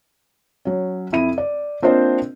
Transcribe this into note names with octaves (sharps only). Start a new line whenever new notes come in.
F#3 C#4
F2 E4 D#7
D5
A#3 C4 D4 F4 C5 D#5